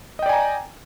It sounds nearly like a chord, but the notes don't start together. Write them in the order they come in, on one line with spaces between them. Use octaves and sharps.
D#5 G5 D5 G#5 A#5